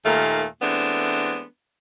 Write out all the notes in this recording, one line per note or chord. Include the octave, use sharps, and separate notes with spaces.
D#2 A#2 D#3 A3 D#4 F5
E3 G#3 A3 B3 C4 D4